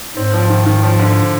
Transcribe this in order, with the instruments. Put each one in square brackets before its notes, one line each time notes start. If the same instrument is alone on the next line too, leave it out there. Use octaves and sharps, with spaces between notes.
[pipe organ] G#2 [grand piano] C4
[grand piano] F3
D#3
D#3
F3
D3